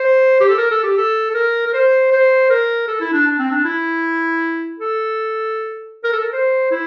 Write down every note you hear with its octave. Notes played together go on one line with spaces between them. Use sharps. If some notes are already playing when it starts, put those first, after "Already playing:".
Already playing: C5
G4
A4
A#4
A4
G4
A4
A4
A#4
A#4
C5
C5
A#4
A4
E4
D4
D4
C4
D4
E4
A4
A#4
A4
A#4
C5
E4